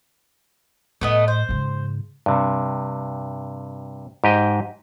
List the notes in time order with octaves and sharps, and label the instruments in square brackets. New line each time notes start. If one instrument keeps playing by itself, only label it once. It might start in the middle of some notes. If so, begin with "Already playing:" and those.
[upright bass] A2 [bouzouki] A3 B3 D#5
[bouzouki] C5
[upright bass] G#2 C#3
[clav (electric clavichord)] G2 C3
G#2 G4 D#5 G5